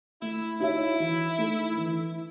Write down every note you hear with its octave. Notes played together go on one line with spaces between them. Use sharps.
A3 E4
D#4 E4 F#4 C#5 E5
E3
A3 D#4 A4
E3